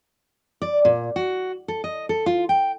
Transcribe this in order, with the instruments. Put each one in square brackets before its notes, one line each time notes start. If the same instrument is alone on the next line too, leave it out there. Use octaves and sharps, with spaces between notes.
[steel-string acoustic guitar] D5
A#2
F#4
A4
D#5
A4
F4
G5